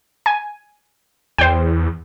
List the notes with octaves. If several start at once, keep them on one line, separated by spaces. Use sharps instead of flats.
G#5
E2 C5 G5